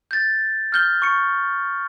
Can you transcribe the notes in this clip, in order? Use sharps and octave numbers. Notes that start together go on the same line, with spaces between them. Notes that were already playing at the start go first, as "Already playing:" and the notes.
G6 A6
F6 G6 G7
C#6 C#7